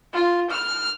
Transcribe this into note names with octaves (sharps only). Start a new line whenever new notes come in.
F4
F6